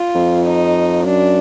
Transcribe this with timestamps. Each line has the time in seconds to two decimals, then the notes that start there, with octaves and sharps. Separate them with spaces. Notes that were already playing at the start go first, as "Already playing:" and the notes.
Already playing: F4
0.15 F2
0.46 D#4
1.06 F#2 D4